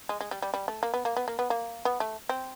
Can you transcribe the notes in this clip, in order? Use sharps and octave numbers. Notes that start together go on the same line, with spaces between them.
G#3
G#3
G3
G3
G3
A3
A#3
B3
A#3
B3
A#3
B3
A#3
B3
A3
C4